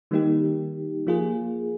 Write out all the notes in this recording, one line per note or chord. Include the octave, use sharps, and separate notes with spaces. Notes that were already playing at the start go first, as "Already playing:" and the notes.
D#3 G3 A#3 D#4 G4
F3 A#3 F4 G#4